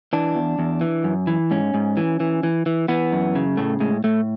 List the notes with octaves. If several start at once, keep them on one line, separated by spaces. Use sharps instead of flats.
E3 D4
E2
E2
E3
F#2
E3
G#2 C#4
G#2
E3
E3
E3
E3
E3 B3
F#2
C#3
A2 A3
A2 G#3
A2 A3